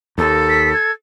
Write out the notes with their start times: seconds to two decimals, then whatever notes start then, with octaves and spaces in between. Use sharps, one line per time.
0.18 D#2 A4
0.49 B6
0.74 G#6